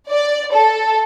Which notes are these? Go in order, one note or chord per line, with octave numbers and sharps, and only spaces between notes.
D5
A4